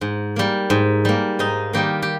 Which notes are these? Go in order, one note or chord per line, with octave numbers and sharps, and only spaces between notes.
G#2
G3 A#3
G#2
G3 A#3
G#2 D#4
D#3 G3 A#3 G4
G4